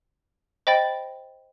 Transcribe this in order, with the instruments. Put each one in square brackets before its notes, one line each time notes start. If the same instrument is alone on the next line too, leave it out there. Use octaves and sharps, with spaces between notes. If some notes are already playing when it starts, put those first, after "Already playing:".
[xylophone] C5 D#5 G5 B5 A6